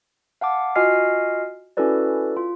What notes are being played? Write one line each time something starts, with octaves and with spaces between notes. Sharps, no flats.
F5 F#5 A5 D6
F4 F#4 D#5 G#5 F6 C7
C#4 E4 F#4 A4 B4 D5
F4